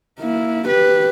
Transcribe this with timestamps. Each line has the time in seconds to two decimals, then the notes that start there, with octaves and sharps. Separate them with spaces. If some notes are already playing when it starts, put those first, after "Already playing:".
0.20 A#3 E4
0.68 G4 B4